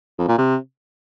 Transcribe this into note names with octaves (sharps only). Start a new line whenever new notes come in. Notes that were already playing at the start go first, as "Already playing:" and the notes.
F2
A#2
C3